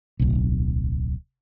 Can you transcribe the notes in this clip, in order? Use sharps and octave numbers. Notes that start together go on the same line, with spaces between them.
D1 B1